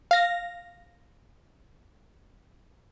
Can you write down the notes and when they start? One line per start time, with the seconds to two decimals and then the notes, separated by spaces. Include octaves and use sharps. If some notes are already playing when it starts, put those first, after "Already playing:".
0.11 F5 A#6